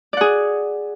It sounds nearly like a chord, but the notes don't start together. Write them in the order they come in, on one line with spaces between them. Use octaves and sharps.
D5 F#5 G#4